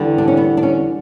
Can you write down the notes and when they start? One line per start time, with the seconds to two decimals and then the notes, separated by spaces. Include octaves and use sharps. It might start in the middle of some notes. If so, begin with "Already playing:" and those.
Already playing: E2 D3 G3
0.18 D4
0.28 C#4
0.37 B3
0.57 D4
0.63 C#4